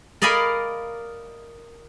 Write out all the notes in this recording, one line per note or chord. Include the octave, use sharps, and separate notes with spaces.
A#4 D5 D#5 F5 G#5 B5